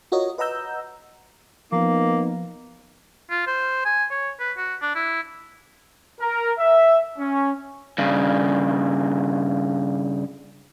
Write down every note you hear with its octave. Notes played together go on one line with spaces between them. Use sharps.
F4 F#4 A#4 C#5 D#5
B4 D#5 F#5 A#5 E6 G6
F3 A#3 B3 D#4
F4
C5
G#5
C#5
B4
F#4
D4
E4
A#4
E5
C#4
G2 C#3